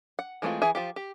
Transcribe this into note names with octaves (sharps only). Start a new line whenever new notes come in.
F#5
E3 G#3 A3 C4 F4
E3 G#4 E5
F3 F4 G4
G4